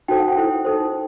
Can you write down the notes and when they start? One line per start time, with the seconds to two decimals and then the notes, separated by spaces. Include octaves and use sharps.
0.08 D#4 F#4 A4 C5 G5
0.19 F#5
0.28 G5
0.37 E4 A4 C5
0.65 D#4 A4 C5